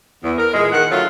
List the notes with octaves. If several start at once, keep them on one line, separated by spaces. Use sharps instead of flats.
E2
A#4
A#2 E3 G#3
D#3 F#5
D3 F#3 A3 F4